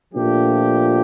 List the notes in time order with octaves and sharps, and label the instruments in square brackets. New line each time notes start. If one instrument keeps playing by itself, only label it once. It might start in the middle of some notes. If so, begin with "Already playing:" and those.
[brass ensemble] A#2 F3 A3 D4 G4